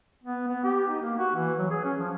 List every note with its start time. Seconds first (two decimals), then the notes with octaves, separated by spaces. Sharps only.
0.24 B3
0.48 B3
0.64 G4
0.88 D#4
1.01 A#3
1.18 F#4
1.35 E3
1.59 F#3
1.70 G#4
1.85 C#4
1.99 F3